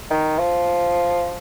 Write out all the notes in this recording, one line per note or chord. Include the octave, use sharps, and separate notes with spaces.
D#3
F3